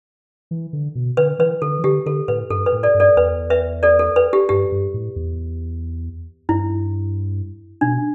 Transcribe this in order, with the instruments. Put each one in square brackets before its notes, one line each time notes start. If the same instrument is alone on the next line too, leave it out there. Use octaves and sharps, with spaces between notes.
[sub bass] E3
D3
B2
[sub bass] D3 [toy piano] B4
[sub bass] E3 [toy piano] B4
[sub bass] D3 [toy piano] A4
[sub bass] E3
[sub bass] D3 [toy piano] G4
[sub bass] D3 [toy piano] A4
[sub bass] A2 [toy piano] B4
[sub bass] G2 [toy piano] A4
[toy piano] B4
[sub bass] A2
[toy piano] A4 D5
[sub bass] G2
[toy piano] A4 D5
[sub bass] E2 [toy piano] B4
[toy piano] B4 E5
A4 D5
A4
B4
G4
[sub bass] G2 [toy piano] G4
[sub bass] G2
A2
E2
[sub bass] G2 [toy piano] E4
[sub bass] B2 [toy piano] D4